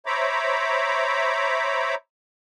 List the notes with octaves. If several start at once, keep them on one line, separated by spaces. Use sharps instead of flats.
C5 C#5 E5 A#5 B5 D6